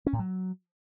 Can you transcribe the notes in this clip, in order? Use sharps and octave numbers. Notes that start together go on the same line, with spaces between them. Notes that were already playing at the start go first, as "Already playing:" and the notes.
C#4
A2
F#3